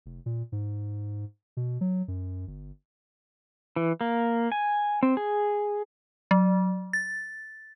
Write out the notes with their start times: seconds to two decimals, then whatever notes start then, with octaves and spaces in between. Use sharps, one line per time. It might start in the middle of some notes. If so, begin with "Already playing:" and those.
0.06 F1
0.26 A#2
0.52 G#2
1.57 B2
1.81 F#3
2.08 F#2
2.48 G1
3.76 E3
4.01 A#3
4.52 G#5
5.03 C4
5.17 G#4
6.31 F#3
6.93 A6